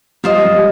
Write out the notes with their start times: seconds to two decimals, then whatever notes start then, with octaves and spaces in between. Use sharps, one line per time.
0.24 G3 F4 C5 D#5
0.44 G3